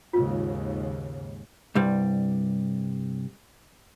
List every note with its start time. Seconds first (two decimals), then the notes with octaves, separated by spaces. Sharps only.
0.13 D#2 G#2 C#3 F4
1.75 C2 G2 G3